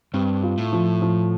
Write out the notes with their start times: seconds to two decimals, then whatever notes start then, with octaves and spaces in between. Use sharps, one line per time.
0.14 G2 C4
0.43 F4
0.58 A2
0.72 F3
1.02 F3